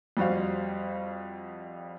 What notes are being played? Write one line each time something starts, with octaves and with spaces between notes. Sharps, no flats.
F2 G3 F#4 C5 F5